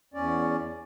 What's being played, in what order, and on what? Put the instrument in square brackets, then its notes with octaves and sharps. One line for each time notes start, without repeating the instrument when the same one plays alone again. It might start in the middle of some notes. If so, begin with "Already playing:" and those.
[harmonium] E2 C#4 D5